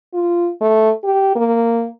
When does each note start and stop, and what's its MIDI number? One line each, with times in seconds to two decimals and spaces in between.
0.14 0.50 65
0.61 0.91 57
1.04 1.34 67
1.36 1.88 58